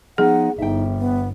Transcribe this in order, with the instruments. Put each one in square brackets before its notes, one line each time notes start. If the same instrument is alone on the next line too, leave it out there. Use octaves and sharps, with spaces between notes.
[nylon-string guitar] F3 B3 D#4 [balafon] G#4 [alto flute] F#5
[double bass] G1 [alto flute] D#4 [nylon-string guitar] E5 G5
[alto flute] B3